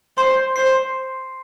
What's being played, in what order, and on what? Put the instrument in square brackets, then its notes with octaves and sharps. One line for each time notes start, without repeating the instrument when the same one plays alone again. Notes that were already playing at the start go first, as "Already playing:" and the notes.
[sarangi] C5 [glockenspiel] C6
[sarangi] C5 [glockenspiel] C7